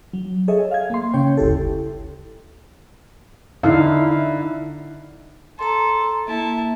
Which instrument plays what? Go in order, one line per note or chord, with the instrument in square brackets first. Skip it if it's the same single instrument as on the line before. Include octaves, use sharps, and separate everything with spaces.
[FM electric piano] F#3
G#4 A4 C#5 D#5 E5 G#5
F5 G#6
A#3 C6
C#3 C#4 C#5 G5
G1 D2 E4 G4 A4
[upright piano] D3 [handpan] D#4 E4 F5
[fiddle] A4 [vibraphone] A#5 C6
[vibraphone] A#3 [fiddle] E4 A5